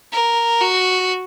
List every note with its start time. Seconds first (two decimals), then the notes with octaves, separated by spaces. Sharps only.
0.12 A#4
0.60 F#4